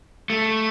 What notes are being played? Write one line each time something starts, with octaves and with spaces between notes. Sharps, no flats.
A3